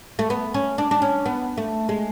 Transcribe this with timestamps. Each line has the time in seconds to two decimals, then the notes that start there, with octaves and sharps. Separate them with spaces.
0.19 A3
0.30 B3
0.54 C#4
0.78 D4
0.91 D4
1.02 C#4
1.26 B3
1.58 A3
1.89 G#3